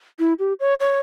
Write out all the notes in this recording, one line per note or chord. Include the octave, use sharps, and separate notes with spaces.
E4
G4
C#5
C#5